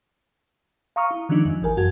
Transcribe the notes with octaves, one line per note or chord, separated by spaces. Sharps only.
F5 A#5 C#6 D#6 F6
E4
D#3 F3 G#3 D4 D#4
F2 F3
G#1 E3 A#4 G#5
F#2 F#4 G#6